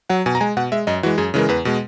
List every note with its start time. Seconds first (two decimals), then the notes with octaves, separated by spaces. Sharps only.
0.10 F#3 F#5
0.26 B2 G#5
0.35 A#5
0.40 G#3 G#5
0.57 B2 F#5
0.72 G#3 E5
0.87 F#2 D#5
1.03 E3 G#3 F#4
1.18 F#2 G#4
1.34 C#3 E3 G#3 A#4
1.49 E2 B4
1.65 B2 G#3